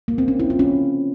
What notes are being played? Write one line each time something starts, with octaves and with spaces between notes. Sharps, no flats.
A#3
C4
C#4
E4
F4
C#4